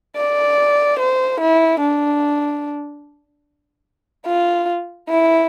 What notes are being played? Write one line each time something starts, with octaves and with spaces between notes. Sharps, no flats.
D5
C5
E4
D4
F4
E4